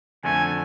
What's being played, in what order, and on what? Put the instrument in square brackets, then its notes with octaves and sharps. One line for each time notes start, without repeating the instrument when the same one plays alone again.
[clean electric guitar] F2 D3 A3 [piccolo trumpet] G#5